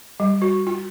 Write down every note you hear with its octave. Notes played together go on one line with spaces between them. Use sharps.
G3
F#4
F4